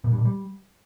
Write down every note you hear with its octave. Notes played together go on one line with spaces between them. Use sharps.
A#2
G2
A#2
G3